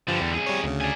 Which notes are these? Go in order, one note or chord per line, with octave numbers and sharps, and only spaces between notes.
G2 D3 F3 G3
E2
C2 G#4
G3 C#5
D2 C#3
D5 G#5